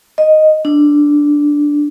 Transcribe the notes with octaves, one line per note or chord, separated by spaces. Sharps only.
D#5
D4